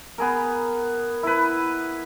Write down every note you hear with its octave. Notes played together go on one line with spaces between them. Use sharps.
B3 G#4 A#4
E4 B4